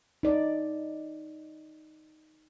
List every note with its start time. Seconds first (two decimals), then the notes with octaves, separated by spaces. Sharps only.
0.23 D#4 D5